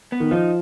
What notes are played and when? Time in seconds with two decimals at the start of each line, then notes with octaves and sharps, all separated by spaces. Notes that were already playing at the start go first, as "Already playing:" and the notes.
0.12 B3
0.20 D#3
0.31 F3 D#4